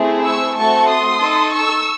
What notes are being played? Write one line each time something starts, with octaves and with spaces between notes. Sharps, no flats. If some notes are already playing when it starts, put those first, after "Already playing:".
Already playing: A3 C4 E4 G#4
C#6 E6
A3 C4 F#4 A4 A5 C#6
C6 D#6
D#4 A4
C#6 E6